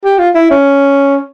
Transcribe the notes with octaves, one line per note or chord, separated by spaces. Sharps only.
G4
F4
E4
C#4